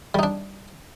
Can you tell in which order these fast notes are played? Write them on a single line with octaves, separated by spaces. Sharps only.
G3 D#4 D4